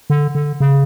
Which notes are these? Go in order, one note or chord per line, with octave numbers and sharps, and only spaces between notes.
D3
D3
C#3